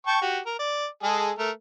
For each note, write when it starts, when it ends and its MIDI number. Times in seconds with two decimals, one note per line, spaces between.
0.07 0.21 79
0.07 0.21 81
0.07 0.21 85
0.22 0.39 66
0.22 0.39 67
0.46 0.55 70
0.59 0.87 74
1.03 1.31 56
1.03 1.31 68
1.03 1.31 69
1.38 1.51 57
1.38 1.51 70